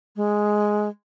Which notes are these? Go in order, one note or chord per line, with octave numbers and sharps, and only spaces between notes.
G#3